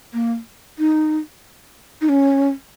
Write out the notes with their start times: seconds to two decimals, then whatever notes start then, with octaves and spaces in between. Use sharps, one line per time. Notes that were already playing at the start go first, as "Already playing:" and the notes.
0.14 A#3
0.79 D#4
2.01 D#4
2.09 C#4